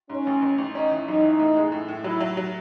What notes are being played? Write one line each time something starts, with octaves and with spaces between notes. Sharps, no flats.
G#2 C#4
A1
A1
A1
C#4 D#4
E3
F#2 D#4
E3
A2
G#3
A2
A2
F#3 E4
F#3
F#3